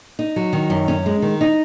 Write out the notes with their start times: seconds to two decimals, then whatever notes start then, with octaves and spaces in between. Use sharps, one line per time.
0.19 D#4
0.36 F#3
0.53 D#3
0.70 F#2
0.88 C#4
1.06 G#3
1.22 D#3
1.41 D#4